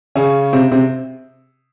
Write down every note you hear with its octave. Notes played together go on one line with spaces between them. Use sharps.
C#3 C#4
C3 C4
C3 C4